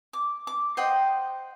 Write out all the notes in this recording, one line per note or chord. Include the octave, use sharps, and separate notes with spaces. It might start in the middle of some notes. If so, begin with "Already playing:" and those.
D6
D6
C5 D#5 F#5 G5